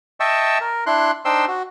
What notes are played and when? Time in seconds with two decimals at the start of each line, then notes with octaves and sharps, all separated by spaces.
0.20 D#5 E5 G5 A5 C#6 E6
0.61 A#4
0.86 D4 E4 C6 F#6
1.25 D4 D#4 C5 G5 C6 E6
1.48 F#4